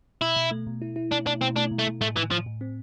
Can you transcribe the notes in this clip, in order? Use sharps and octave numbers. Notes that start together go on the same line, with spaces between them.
B2 E4
B2
A3
B2
E4
E4
B2 D4
B2 D4
B2 C4
A3 D4
B2
A3
B2
A2 A3
A2 E3
A2 F3
A2
C4